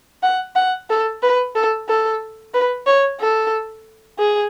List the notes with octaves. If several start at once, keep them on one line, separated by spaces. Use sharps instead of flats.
F#5
F#5
A4
B4
A4
A4
B4
C#5
A4
G#4